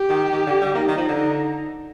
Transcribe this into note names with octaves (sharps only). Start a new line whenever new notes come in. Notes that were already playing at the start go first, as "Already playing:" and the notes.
Already playing: G4
D#3
D#3
D3
G3
A#3 D#4
D#3
F3
D3